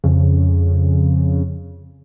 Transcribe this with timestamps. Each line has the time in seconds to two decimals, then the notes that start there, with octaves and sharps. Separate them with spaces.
0.04 F2 C#3